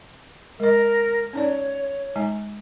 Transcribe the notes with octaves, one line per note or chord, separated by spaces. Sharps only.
G#3 A#4 D#5
C#4 D#4 C#5 D5
G#3 D#4 G#5